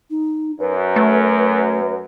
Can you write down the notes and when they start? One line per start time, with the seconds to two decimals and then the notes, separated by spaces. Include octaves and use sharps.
0.10 D#4
0.59 F#2 B4
0.96 A3